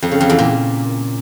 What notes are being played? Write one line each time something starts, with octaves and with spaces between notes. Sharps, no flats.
F2
C#3
F2
E2
A#2